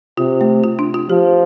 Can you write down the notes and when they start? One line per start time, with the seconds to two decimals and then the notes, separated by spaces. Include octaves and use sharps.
0.17 C3 F4
0.41 A3
0.64 F4
0.79 D4
0.94 F4
1.10 F3 G4